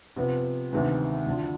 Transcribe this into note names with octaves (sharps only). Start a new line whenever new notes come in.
C3 F3 B3
D2 C3 D#3 G#3 B3
D2 D3 F3